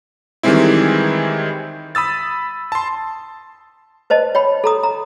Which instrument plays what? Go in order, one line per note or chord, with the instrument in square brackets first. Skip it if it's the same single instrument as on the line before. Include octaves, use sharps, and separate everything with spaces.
[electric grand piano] D#3 E3 G3 G#3 C4 E4
B5 D#6 E6 A6
A5 C6
[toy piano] B4 C5 D#5 A5
C#5 G5 B5
A4 A#5 D#6
A#5